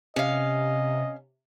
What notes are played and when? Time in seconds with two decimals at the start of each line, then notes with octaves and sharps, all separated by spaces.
0.16 C3 C#4 D#5 F5